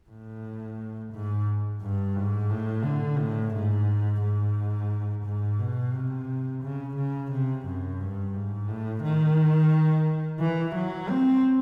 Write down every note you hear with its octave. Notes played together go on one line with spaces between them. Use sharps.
A2
G#2
G2
G#2
A2
D3
A2
G#2
G#2
G#2
B2
C3
C#3
C#3
C3
F#2
G2
G#2
A2
D#3
E3
F#3
C4